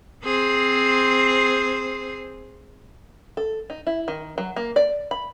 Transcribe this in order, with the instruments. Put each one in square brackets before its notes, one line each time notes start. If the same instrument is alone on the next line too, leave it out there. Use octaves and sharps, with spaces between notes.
[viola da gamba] C4 G#4 C5
[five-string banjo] A4
D#4
E4
D#3
F#3
A#3
D5
B5